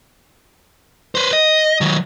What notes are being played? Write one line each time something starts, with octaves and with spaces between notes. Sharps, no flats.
B4 C5
D#5
D#3 F#3